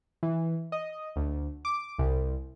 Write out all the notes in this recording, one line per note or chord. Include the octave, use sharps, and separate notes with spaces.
E3
D#5
D2
D6
C2